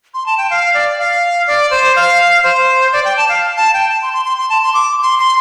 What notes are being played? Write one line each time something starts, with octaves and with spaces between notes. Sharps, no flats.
C6
A5
G5
F5
D5
F5
D5
C5
F5
C5
D5
G5
A5
F5
A5
G5
A5
C6
C6
C6
C6
A5
C6
D6
C6
C6